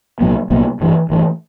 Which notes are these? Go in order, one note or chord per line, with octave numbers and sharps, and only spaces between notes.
C2 A#2 F#3 B3
C2 A#2 F#3 B3
A1 G2 E3
A1 G2 E3